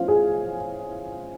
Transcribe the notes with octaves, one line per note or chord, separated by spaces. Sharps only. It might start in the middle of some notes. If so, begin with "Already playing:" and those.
Already playing: C#4 F4 C5 F5
G#4 G#5